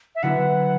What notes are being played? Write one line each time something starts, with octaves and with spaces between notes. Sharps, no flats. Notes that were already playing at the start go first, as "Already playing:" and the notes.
E5
D3 F#3 B3 E4 F#5